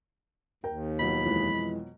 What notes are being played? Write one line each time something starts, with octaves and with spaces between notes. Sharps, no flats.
D#2 A#4 G5
B2 F3 F#3 B5
F2 E3 G#3